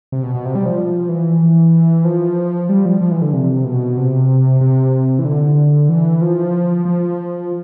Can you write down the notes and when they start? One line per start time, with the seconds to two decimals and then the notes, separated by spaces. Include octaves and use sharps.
0.12 C3
0.23 B2
0.34 B2
0.45 C3
0.55 G3
0.66 F3
1.09 E3
2.05 F3
2.69 G3
2.86 F3
3.01 F3
3.11 E3
3.22 D3
3.33 C3
3.65 B2
3.97 C3
4.61 C3
5.19 E3
5.25 D3
5.89 E3
6.22 F3
6.85 F3